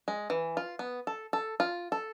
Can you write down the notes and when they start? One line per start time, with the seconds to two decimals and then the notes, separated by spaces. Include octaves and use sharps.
0.08 G#3
0.30 E3
0.57 F4
0.79 B3
1.07 A4
1.33 A4
1.60 F4
1.92 A4